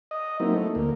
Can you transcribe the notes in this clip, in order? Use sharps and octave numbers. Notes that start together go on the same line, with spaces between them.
D#5
F#3 A#3 C4 D#4 E4
A3
D2 A#3